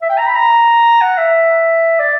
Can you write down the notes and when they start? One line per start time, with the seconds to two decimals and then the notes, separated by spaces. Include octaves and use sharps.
0.02 E5
0.10 G5
0.18 A#5
0.26 B5
0.35 A#5
1.01 F#5
1.18 E5
2.00 D5